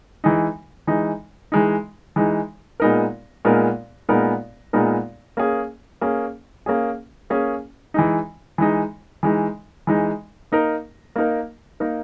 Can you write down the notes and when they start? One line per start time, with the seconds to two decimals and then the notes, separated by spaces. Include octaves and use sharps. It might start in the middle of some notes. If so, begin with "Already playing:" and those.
0.24 E3 G#3 D#4
0.87 E3 G#3 D#4
1.52 E3 G#3 D#4
2.16 E3 G#3 D#4
2.80 A#2 G#3 B3 D#4 A#4
3.45 A#2 G#3 B3 D#4 A#4
4.09 A#2 G#3 B3 D#4 A#4
4.73 A#2 G#3 B3 D#4 A#4
5.37 A#3 C#4 G#4
6.01 A#3 C#4 G#4
6.66 A#3 C#4 G#4
7.30 A#3 C#4 G#4
7.94 E3 G#3 D#4
8.58 E3 G#3 D#4
9.23 E3 G#3 D#4
9.87 E3 G#3 D#4
10.52 A#3 D#4 A#4
11.16 A#3 D#4 A#4
11.80 A#3 D#4 A#4